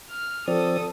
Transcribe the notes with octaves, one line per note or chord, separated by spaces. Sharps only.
F6
F3 C4 A4 D5 D#6